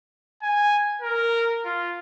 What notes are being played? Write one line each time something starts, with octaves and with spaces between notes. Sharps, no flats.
G#5
A#4
F4